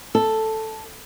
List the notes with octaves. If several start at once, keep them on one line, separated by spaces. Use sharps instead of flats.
A4